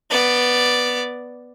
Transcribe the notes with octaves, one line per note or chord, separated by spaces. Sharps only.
B3 D5